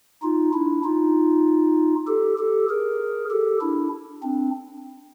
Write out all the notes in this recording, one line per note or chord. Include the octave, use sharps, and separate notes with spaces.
D#4 F4
D4 E4
D#4 F4
G4 A4
G4 A4
G#4 A#4
G4 A4
D4 E4
C4 D4